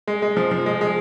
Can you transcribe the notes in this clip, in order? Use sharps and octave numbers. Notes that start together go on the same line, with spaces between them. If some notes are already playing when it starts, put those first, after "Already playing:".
G#3
G#3
F3
F3
G#3
G#3